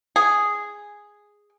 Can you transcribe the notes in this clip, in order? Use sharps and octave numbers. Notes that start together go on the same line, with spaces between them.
G#4